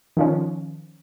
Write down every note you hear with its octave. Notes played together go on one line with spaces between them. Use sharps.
D#3 F3 C#4